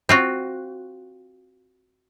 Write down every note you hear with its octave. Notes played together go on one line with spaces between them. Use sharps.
C4 F4 F#4